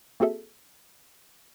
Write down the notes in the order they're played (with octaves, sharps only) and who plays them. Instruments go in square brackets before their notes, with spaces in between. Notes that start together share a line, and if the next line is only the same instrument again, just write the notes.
[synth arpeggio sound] A#3 C4 F#4 G#4 A4 E5